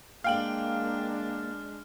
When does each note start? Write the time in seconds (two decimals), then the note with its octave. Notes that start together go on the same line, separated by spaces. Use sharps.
0.24 G#3 A#3 D4 F5 G5 F6 F#7